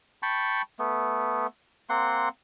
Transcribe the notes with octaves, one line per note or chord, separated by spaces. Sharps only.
G5 A5 B5 C#6
A3 B3
A#3 C4 F#5 C6